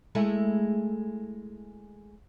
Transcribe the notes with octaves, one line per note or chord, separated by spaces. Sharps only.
G#3 A3 E4